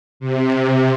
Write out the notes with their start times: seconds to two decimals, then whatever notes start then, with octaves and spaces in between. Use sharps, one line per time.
0.20 C3